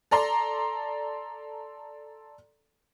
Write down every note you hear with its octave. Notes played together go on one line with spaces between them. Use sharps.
A4 D5 A#5 C6